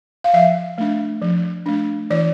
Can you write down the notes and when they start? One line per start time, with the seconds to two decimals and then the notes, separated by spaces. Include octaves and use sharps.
0.24 F5
0.34 F3 E5
0.78 A3 D4
1.22 F3
1.66 A3 D4
2.10 E3 D5